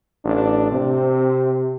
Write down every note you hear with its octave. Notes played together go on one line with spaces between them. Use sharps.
A1 D4
C3 C4